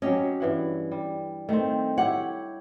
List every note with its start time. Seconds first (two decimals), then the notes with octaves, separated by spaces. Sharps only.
0.02 F#3 C#4 G4 D#5
0.40 G2 E3 F#5
0.92 G3
1.49 D#3 A3 C4
1.98 E4 G4 C#5 F#5